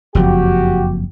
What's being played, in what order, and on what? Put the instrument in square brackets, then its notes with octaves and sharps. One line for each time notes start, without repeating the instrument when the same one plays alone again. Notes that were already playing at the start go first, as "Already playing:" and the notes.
[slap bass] F#1 F2 F3 [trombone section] F#4 G4